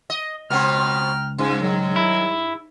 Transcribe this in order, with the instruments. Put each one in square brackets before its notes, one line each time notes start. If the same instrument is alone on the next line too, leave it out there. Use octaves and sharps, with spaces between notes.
[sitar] D#5
[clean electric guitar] C#2 [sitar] B2 B3 C4 [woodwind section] G5 A#5 F6
[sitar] G2 [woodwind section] F3 G#3 C#4
[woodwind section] D#3 F#3
[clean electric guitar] E4